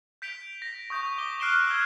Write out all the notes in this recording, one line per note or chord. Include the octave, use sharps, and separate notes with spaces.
G6 B6 D7 F7 G7
A#6
C#6 D#6 G6
D6 G7
F6 F#6 C7 D7 E7 G7
E6 G#6